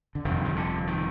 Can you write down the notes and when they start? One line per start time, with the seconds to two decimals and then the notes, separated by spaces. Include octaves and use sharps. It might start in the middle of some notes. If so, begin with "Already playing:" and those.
0.15 D3
0.24 G1 F2 C3 D#3
0.45 D#3
0.56 D3
0.87 D#3